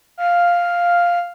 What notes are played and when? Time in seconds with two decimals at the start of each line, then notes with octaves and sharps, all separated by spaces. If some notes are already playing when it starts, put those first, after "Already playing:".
0.18 F5